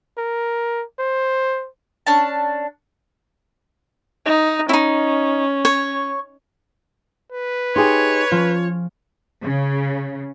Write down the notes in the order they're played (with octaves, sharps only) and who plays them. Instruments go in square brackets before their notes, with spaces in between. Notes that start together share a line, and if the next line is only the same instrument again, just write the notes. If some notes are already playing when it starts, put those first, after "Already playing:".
[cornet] A#4
C5
[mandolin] C#4 D4 A5
[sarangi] D#4
[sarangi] C#4 [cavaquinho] D#4 E4
[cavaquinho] C#5
[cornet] B4
[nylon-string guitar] D#4 G4 G#4 [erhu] C#5 [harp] C6 G#6 C#7
[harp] F3 C#4 [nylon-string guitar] F4
[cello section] C#3